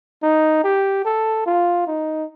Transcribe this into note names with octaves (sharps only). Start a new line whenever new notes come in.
D#4
G4
A4
F4
D#4